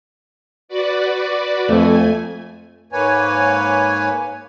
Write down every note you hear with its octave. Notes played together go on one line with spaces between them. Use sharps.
F#4 B4 D5
F2 A3 G#5
G#2 A#3 B4 C#5 G#5